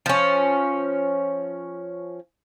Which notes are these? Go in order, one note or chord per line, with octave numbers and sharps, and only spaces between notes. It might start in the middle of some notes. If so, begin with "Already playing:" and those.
F3 C#4